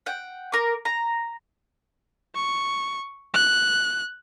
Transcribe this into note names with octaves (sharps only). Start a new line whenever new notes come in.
F#5 G5
A#4 D6
A#5
C#6
F#6